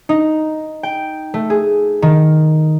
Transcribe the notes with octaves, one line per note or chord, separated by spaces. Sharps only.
D#4
G5
A3
G#4
D#3